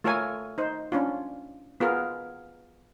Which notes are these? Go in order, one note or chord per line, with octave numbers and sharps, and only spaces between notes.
A3 F4 A4 A#4 C#5 G#5
D#4 C5
C#4 D4 F4
B3 F4 G#4 A#4